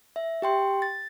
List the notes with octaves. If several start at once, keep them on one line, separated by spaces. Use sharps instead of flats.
E5
G4 G5 C6
A6